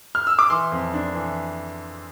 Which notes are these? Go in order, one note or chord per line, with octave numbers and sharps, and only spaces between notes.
F6
E6
D6
E3 C6
F2
D4
E3